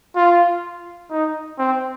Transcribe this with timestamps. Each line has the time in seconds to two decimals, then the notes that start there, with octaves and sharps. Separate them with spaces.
0.16 F4
1.11 D#4
1.59 C4